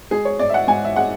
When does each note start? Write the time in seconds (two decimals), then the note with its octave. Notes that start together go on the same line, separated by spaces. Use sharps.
0.11 G#3 G#4
0.25 C#5
0.39 G#2 D5
0.50 E5
0.54 F#5
0.67 G#2 G#5
0.85 E5
0.96 G#3 F#5